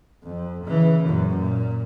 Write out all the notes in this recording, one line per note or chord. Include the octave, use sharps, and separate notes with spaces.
F2
C#3 E3
F#2 A#2
A#2